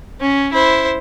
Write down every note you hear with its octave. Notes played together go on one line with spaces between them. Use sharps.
C#4
E4 C5